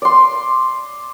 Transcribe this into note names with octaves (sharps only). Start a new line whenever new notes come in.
D5 C6